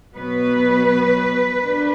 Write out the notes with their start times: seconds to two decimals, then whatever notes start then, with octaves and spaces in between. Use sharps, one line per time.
0.15 B2 F#3 B3 B4
1.61 B2 A#3 D4